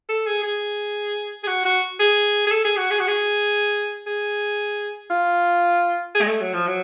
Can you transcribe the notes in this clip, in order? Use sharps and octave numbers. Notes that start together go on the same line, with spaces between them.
A4
G#4
G#4
G#4
F#4
F#4
G#4
G#4
A4
G#4
F#4
G#4
F#4
G#4
G#4
F4
G#4
G#3
A3
F#3
F3
F#3